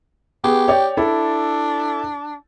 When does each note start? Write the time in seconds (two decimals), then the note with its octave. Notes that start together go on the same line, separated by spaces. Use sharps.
0.44 B3 G4 G#4
0.68 C#5 D5 G5
0.97 D4 E4 A4